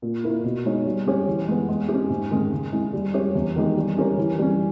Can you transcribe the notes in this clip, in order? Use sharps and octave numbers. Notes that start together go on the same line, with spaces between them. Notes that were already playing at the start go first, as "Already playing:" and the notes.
A#2
A#3 E4
B2
G#3 D#4 G#4 C#5
G3
C#4 G4 C#5
E3
G#3 B3
G#3
G4
C#4
G#2
D#3 G#3 C#4
C#3
G#3 C#4 E4
G3
A#3 C#4 G4 C#5
E2
D#3 G#3 D#4 G4
G3
C#4 G4 A#4 C#5
E3
G3 C#4